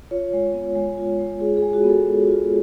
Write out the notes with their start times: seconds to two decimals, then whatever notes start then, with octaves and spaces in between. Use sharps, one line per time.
0.11 F4 C#5
0.33 G#3
0.54 B3
0.76 G#3
0.98 F4
1.19 G#3
1.40 F4 G#4
1.57 G#4
1.63 G#3
1.73 F#4
1.84 B3
1.90 A4
2.05 G#3
2.27 F4